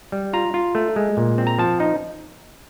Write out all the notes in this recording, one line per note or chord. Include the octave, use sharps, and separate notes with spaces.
G3
F4 A#5
F4
A3
G#3
A#2
C4
A#5
F3 A5
D#4